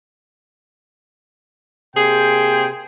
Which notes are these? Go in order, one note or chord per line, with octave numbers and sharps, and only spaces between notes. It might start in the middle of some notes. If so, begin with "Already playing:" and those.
C3 A#3 G#4 C5 G5